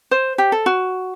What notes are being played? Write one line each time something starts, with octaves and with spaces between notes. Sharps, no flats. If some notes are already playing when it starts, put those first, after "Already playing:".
C5
G4
A4
F#4